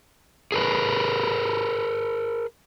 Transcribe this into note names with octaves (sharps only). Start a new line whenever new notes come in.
G#4 A#4 B4